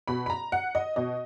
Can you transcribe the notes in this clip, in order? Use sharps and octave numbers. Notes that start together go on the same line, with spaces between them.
B2 B5
B5
A#5
F#5
D#5
B2 D#5